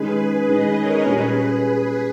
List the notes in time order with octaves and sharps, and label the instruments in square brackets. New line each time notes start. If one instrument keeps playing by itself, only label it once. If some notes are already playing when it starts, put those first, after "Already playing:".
Already playing: [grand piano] D#3 G#3 C#4 [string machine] G#4 B4
[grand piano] D#3 G#3 C#4 [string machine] B4 D#5
[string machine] A#4 C#5
[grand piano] A#2 G3 C#4 [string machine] G#4 B4